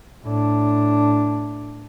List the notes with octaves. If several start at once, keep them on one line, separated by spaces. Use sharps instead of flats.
A2 D4